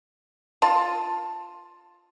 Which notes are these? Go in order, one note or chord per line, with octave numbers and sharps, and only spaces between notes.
F4 A5